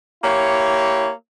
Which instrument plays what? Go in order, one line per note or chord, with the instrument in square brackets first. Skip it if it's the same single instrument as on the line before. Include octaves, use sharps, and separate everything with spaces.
[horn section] A#3 E4 G4 C#5